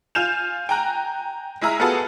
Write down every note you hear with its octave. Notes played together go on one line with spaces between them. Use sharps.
F4 G#5 G6 E7 F7
G5 G#5 A#5 F#6
G#3 E4 G#4 E5 A#5 F6
B3 F4 F#4 G#4 A4 B4